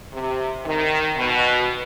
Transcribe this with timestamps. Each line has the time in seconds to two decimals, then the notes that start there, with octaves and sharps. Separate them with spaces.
0.12 C3
0.65 D#3
1.16 B2